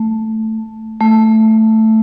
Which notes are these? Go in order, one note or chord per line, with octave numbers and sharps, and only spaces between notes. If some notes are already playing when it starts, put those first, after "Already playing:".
Already playing: A3
A3